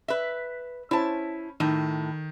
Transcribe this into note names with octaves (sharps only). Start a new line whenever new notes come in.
B4 E5
C#4 E4 C5 A5
A2 D#3